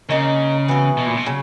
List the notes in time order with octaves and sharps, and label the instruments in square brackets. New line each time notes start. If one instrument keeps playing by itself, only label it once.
[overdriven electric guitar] C#3 [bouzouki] A#3 D#4 A#4
[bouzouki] E3 B3 F#4
[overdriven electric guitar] B2
A#2
B2
[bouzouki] C#3 F#3